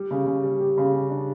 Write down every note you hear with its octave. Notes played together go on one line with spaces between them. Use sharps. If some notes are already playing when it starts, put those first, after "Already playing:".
Already playing: G3
C#3
C#3
G3
G4
C#3
G4
D4